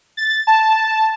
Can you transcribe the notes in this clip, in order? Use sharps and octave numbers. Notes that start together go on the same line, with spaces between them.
A6
A5